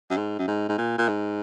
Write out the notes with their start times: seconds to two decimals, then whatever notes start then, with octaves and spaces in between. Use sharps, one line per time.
0.10 F#2
0.17 G#2
0.39 F#2
0.47 G#2
0.69 G#2
0.78 A#2
0.98 A#2
1.08 G#2